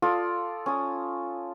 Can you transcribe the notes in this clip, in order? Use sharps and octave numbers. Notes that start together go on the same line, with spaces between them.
F4 A4 D5 D#6
C#4 D#6